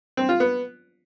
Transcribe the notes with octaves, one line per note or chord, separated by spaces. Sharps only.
C4
F4
B3